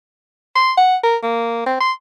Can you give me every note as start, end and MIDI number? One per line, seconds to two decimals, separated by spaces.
0.56 0.72 84
0.77 0.96 78
1.03 1.16 70
1.23 1.65 58
1.66 1.78 60
1.80 1.92 84